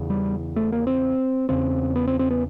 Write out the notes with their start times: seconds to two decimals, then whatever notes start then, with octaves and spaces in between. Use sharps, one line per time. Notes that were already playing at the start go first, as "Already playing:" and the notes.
Already playing: E2 C#3
0.10 G3
0.56 A3
0.72 A#3
0.87 C4
1.49 E2 C#3 C4
1.96 B3
2.07 C4
2.19 C4
2.30 B3